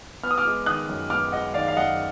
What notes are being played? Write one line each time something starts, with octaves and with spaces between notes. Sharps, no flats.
B3 F6
D#6
D6 F6
G#3
D#3 D#6 F#6
F#2
B3 D6 F6
G#3 D#5 F#5
D#3 D5 F5
F5
F#2 D#5 F#5